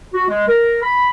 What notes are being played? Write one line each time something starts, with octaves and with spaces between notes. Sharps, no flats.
F#4
G#3
A#4
B5